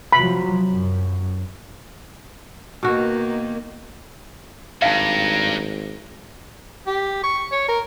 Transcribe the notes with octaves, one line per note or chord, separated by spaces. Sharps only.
C3 F3 F#3 B5
F#2
B2 D#3 A#3 F#4
G#1 G2 F5 A5 A#5
G4
C#6
C#5
A#4